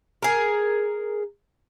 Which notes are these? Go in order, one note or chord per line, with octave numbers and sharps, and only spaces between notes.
G#4 A#4